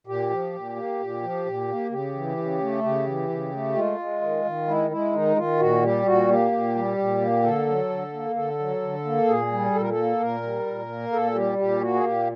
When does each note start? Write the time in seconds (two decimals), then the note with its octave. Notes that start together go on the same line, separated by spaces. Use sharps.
0.07 A#2 G4
0.30 F3
0.54 A#2
0.76 A#3
0.99 A#2
1.22 F3
1.45 A#2
1.68 A#3
1.91 C#3 G4
2.14 E3
2.37 C#3
2.60 A3
2.83 C#3 G4
3.06 E3
3.30 C#3
3.53 A3
3.75 G#3 F4
3.99 G#3
4.22 D#3
4.45 D#3
4.68 G#3 E4
4.90 G#3 E4
5.13 D#3 D#4
5.36 D#3 F4
5.59 A#2 F#4
5.83 G3 G4
6.06 A#2 F#4
6.29 A#3 G4
6.52 A#2
6.75 G3
6.98 A#2
7.21 A#3
7.44 D3 A4
7.67 F#3
7.90 D3
8.13 A#3
8.36 D3 A4
8.59 F#3
8.82 D3
9.05 A#3
9.28 A#2 G#4
9.51 G3
9.74 A#2 A4
9.82 A#4
9.89 A4
9.97 A#3
10.20 A#2 A#4
10.43 G3
10.66 A#2
10.89 A#3
11.12 A#2 A4
11.35 G3 G4
11.58 A#2 G4
11.81 A#3 F#4
11.94 G#4
12.04 A#2 G4